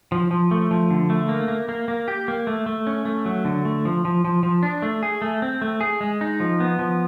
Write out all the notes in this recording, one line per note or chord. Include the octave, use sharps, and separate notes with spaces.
F3
F3
A3
F3
D3
A3
A#3
A#3
A#3
A#3
G4
A#3
A3
A3
C#4
A3
F#3
D3
A3
F3
F3
F3
F3
D4
A3
G#4
A3
C4
A3
G#4
G#3
D#4
F3
B3
F3